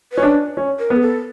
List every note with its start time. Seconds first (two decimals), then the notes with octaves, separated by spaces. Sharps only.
0.13 C#4 B4
0.23 D4
0.57 C#4
0.79 A#4
0.90 B3
0.96 G#4
1.01 A4